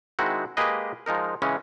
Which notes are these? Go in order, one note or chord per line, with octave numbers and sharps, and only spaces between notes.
D#3 G#3 C4 D#4 E4 F#4
G#3 A#3 G4 G#4 B4 D#5
F3 G#3 D#4 A#4
C#3 E3 G#3 C#4